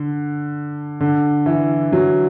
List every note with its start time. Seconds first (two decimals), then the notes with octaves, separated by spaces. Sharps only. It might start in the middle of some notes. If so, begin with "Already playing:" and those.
Already playing: D3
1.00 D3
1.46 E3
1.92 F#3